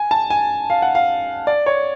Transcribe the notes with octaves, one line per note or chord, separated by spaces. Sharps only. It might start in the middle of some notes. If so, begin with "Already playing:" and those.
Already playing: G#5
A5
G#5
F5
F#5
F5
D5
C#5